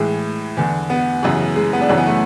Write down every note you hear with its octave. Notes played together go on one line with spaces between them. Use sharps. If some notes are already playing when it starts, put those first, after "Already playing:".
Already playing: A2 E3 G#3
E2 D3
B3
F#2 C#3 E3
G#3
B3
D4
F#2 C#3 E3 C#4
B3
A3